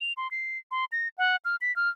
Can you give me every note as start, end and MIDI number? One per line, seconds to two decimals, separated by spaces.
0.01 0.13 101
0.17 0.30 84
0.31 0.58 96
0.71 0.85 84
0.92 1.08 94
1.18 1.36 78
1.45 1.56 89
1.61 1.74 95
1.76 1.89 89